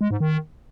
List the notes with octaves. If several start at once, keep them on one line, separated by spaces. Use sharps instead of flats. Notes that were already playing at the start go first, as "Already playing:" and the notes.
G#3
G#2
D#3